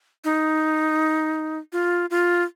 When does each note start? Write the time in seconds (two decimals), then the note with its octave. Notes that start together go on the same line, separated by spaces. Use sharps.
0.24 D#4
1.73 F4
2.11 F4